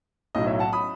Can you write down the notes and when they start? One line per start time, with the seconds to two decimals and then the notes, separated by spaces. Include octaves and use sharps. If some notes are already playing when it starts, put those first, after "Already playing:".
0.35 B1 A2 F#3 D#5
0.47 C#5 E5
0.59 F#5 A5
0.73 B5 D#6